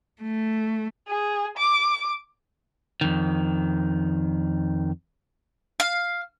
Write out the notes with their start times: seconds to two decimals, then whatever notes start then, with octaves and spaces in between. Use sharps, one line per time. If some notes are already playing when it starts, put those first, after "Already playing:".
0.22 A3
1.08 G#4
1.58 D6
3.01 F2 D#3
5.80 F5